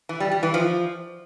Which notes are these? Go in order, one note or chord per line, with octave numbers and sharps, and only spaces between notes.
E3
G3
G3
E3
F3